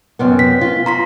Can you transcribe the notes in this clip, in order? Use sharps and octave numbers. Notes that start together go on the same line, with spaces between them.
F#2 C3 B3
B6
F4
A#5 C6 B6